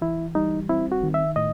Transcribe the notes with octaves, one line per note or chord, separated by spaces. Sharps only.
E3 E4
G3 D#4
C4 E4
F#4
D#3
E5
A2 D#5